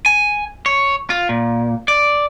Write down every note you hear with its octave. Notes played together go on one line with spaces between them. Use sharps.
G#5
C#5
F4
A#2
D5